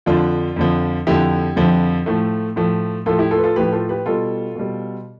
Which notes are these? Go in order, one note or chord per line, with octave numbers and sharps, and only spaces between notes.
F2 D3 F3 D4 F4
F2 D3 F3
F2 D3 F3 E4 G4
F2 D3 F3
A2 F3 A3
A2 F3 A3
A2 F3 A3 F4 A4
E4 G4
F4 A4
B4
F4 A4
A2 F3 A3 G4 B4
F4 A4
G4 B4
B2 G3 F4 A4
B2 G3